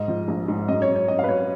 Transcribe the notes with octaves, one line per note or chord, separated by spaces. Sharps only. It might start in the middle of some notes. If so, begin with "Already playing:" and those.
Already playing: G#2 D#5
F3
A#1
G#2
F#2 D#5
C#5
F#2
C#5
F#2 D#5
F5
B4
F#2 C#5